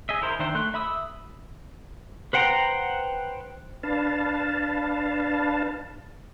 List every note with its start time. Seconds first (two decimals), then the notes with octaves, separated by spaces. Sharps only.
0.09 G#4 D#5 E5
0.22 E4 A#4 C5
0.39 D#3 D4 C5 E5 G5
0.55 A3 C6 F#6
0.74 E5 B5 D#6 E6
2.33 B4 C5 F#5 G5 A#5
3.83 D4 B4 F5 A5